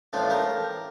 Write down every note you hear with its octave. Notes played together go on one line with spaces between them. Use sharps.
A1 A2 F3 D4 F4
G4 A#4